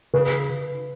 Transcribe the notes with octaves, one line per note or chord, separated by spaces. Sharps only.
C#3 B4